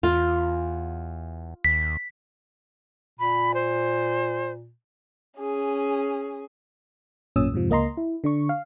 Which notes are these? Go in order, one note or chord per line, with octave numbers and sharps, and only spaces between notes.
E2 F4
D#2 B6
A#2 B5
C5
C#4 G#4
A1 F#2 A#2 C#4 D#6 E6
F2 G#2 C3 F3
C#2 A#3 D#5 A#5 C6
E4
D3 D4 C#6
F5